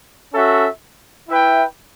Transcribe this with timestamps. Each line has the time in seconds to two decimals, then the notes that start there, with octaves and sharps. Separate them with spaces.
0.33 C#4 F#4 A4 E5
1.29 E4 B4 E5 G5